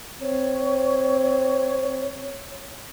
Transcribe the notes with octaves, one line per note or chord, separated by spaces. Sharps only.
C4 C#5